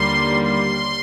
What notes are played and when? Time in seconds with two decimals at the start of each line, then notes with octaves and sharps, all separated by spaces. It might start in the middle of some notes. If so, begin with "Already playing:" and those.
Already playing: D#2 D3 G3 A#3 C6
0.45 C6